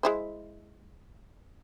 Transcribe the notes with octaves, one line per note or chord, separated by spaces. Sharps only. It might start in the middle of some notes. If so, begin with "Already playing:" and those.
G#3 E4 C5